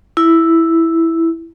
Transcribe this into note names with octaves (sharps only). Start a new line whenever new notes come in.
E4